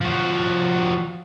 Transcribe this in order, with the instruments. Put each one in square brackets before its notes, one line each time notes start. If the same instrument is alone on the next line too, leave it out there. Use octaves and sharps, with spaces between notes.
[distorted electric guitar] F3 F#4